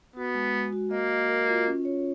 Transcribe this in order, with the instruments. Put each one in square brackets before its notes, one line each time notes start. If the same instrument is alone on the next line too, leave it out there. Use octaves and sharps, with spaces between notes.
[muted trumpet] B3 [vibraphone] F#4
[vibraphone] G#3
G#3
F#4
[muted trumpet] A#3 [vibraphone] D#5
[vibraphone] D#5
A#4
F4
C#4
C#5